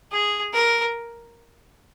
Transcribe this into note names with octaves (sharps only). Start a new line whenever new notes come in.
G#4
A#4